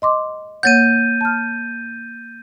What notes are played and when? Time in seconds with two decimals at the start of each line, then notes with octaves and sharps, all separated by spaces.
0.02 D#5 C6 D6
0.63 A#3 C#5 F#5 G6 A6 D#7
1.21 A5 F6